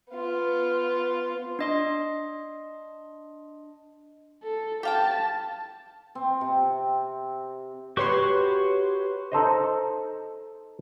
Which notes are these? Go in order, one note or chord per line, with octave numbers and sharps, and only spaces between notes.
B3 F4
D4 D#5 C6
A4
G4 F5 G5 A5
C4
C3
F#4 G4 B4 C#5 C6 C#6
D#4 A4 C5 D#5